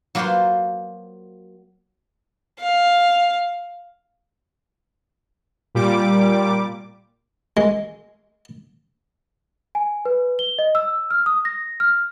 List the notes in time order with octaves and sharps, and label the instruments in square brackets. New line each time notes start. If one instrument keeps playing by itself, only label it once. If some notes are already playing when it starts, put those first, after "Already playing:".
[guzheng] F#3 A#3 F4 B4 C5 C6
[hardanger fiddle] F5
[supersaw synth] A#2 G3 D6
[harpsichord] G#3
[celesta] G#5
B4
G7
D#5
E6
F6
D#6
A#6
F6